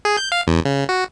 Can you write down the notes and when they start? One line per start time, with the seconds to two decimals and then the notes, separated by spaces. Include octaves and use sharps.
0.05 G#4
0.17 G6
0.32 F5
0.47 E2
0.65 C#3
0.89 F#4